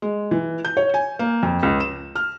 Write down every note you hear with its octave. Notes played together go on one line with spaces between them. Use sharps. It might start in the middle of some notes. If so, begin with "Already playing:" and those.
G#3
E3
G6
C#5
G#5
A#3
F2
C#2
E7
F6